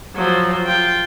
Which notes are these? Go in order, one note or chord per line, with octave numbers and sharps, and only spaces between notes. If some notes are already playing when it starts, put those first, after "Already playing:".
F3 F#3
F4 G5